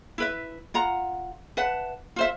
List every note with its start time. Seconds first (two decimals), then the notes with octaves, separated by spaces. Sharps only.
0.18 E4 B4 E5
0.74 F4 F#5 A#5
1.57 B4 E5 F#5 A5
2.16 F4 C5 E5